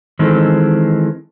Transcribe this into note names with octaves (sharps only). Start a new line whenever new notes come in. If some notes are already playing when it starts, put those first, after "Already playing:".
D#3 E3 G#3 C4 A4